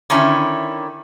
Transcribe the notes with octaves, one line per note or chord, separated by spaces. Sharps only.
D3 D#3 C#4 E4